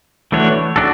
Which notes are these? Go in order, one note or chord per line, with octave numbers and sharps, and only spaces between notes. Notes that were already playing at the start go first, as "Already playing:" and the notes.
E3 A3 D4 F#4 C#5
D4 F#4 A4